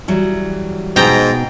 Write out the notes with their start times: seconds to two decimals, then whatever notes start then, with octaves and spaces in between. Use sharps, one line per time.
0.08 E3 F#3 G3
0.96 G#2 B2 D#4 G5 G#5 A#5